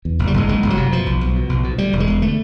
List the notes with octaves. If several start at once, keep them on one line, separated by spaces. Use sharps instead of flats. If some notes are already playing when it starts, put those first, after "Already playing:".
E2
F#1
G3
F#1 G#3
F#1 G#3
F#1
F#3
C3
B2 F3
B1
B1
B2
B1
B2
D2 G3
E1
G#3
E1
D3 A3